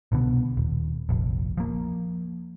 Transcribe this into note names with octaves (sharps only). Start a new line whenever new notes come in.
C2 B2 D3 B3
D#1
F1 A#1
F3 A#3